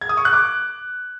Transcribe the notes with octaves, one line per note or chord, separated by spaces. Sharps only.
G#6
D#6
C#6
F#6
D6